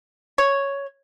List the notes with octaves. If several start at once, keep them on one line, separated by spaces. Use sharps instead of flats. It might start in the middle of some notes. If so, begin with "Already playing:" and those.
C#5